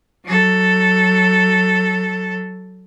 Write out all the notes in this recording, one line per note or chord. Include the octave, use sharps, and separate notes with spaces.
F#3 A4